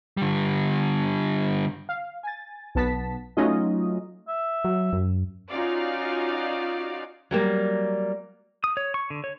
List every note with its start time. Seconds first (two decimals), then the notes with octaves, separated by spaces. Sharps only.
0.17 D3 G3
1.89 F5
2.23 G#5 A6
2.75 B1 B3 A5 B6
3.37 F#3 A3 C#4 D#4 F4 D#5
4.28 E5
4.65 F#3
4.93 F#2
5.49 C#4 D#4 F4 F#4 D5 F5
7.31 F#3 G3 A#3
8.64 D#6
8.77 C#5
8.94 C#6
9.10 D3
9.24 C#5